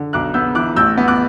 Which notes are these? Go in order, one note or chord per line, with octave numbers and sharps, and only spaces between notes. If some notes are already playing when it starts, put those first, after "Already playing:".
Already playing: D3
B1 D6 F#6
B3 E6 G6
E3 D6 F#6
A1 E6 G6
B3
D6 F#6